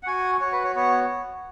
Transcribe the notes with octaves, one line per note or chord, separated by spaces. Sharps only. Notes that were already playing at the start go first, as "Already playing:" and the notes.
F#5
F#4 G#5
F#4 C#5
B4
C#5
B3 C#5